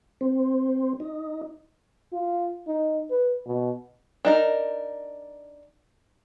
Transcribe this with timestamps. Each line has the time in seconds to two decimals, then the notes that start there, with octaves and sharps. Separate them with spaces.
0.21 C4
1.00 D#4
2.13 F4
2.67 D#4
3.10 B4
3.46 B2
4.25 D4 D#4 A#4